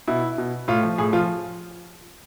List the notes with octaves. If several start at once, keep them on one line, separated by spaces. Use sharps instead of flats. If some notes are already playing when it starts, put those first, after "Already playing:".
B2 E4
B2
A2 F4
F3
A2 G#4
F3 F4